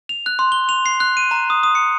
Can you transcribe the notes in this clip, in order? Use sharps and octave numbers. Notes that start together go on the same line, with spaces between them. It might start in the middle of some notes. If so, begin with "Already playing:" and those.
F7
F#6
C6
G7
F7
C7
F#6
D#7
A#5
D#6
D#6
C#7